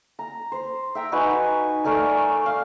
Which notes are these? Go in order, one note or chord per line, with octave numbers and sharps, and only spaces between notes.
A#5
C5
E5 G5 A#5
D#4 F#4 B4 G#5
A3 A#4 D5 G#5
F5